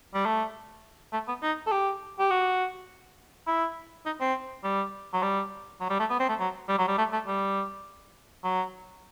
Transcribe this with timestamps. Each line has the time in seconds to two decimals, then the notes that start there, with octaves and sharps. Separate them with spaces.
0.14 G3
0.26 A3
1.13 A3
1.28 B3
1.43 D#4
1.67 A4
1.72 G4
2.19 G4
2.31 F#4
3.47 E4
4.06 D#4
4.21 C4
4.64 G3
5.13 F#3
5.23 G3
5.81 F#3
5.90 G3
6.00 A3
6.10 B3
6.20 C4
6.29 A3
6.39 F#3
6.69 G3
6.78 F#3
6.88 G3
6.98 A3
7.13 A3
7.27 G3
8.44 F#3